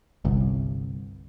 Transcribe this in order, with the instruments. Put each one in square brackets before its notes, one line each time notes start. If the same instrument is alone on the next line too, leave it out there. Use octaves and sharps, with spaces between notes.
[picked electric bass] G1 C2